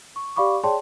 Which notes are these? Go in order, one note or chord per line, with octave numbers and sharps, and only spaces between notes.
C#6
G4 D5 F5 B5 C#6 D6
G#4 C#5 D5 G5 A5 C6